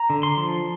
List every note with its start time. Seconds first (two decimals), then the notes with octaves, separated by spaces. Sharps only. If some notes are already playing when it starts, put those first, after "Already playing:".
Already playing: A#5
0.10 D3
0.23 C6
0.37 F3